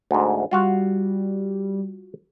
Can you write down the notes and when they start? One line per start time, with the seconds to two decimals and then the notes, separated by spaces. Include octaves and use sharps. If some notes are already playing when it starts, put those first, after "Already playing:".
0.11 D2 G#2
0.51 G3 F4 F#4 F5